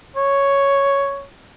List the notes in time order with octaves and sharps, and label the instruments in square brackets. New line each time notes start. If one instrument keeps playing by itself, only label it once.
[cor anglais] C#5